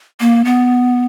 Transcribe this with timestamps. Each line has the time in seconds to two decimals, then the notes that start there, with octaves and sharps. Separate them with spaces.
0.20 A#3
0.45 B3